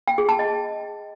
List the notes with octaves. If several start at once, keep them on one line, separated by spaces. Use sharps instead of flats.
G5
G#4
A5
D#5